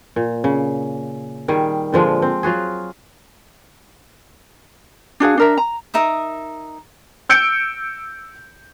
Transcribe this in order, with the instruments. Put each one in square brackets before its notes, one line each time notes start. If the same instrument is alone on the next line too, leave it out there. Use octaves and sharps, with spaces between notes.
[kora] A#2
C#3
D#3 G3 G#4
A#2 D3 F3 G#3
C4
F#3 F4 F#4 G#4
[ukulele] D4 F#4 G#4 F5
D4 A#4 E5
A#5
[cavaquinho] D#4 A#4 E5 D#6
[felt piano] E6 G6 C#7 D7